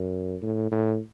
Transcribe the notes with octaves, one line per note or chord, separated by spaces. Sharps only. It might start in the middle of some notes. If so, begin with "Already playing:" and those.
Already playing: F#2
A2
A2